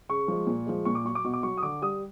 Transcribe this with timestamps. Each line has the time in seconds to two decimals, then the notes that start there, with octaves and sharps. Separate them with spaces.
0.09 C#3 C#6
0.28 F3 G#3
0.47 A#2
0.66 F3 G#3
0.85 A#2 C#6
0.95 D6
1.05 F#3 C#6
1.15 D6
1.25 B2 C#6
1.34 D6
1.43 F#3 C#6
1.57 D#6
1.63 D3 D6
1.82 G3 D#6